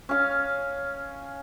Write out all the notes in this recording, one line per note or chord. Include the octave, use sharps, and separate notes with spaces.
C#4 F5